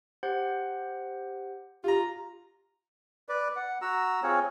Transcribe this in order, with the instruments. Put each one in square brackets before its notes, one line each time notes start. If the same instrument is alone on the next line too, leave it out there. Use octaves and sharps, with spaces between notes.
[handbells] G4 C5 F#5
[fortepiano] F4 A#5 [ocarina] G4
[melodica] B4 D5
F#5
F#4 A#5 E6
C4 F4 G#4 C#5